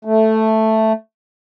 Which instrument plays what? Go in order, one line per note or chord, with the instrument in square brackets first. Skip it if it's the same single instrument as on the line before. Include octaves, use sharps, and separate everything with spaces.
[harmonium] A3